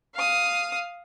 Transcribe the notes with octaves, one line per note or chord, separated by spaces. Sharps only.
F5 D#6